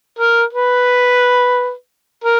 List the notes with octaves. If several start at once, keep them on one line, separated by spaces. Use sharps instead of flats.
A#4
B4
A#4